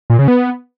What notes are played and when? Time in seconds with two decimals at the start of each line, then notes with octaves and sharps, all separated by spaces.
0.10 A#2
0.19 C#3
0.28 B3